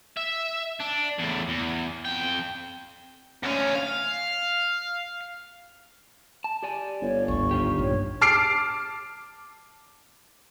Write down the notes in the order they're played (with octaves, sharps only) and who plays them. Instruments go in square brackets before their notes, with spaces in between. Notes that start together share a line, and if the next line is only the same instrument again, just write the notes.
[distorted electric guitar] E5
D4
E2 A2
E2
F2 G5
D2 C#4
F5
[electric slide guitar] A5
G4 D5 G#5
[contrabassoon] G1 [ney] C#5
[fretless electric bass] G#1 D2 [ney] C#6
[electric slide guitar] D#4 F4 G4
[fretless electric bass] A#1 G2 A#2 [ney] C#5
[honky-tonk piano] A5 D6 F6 C7 D7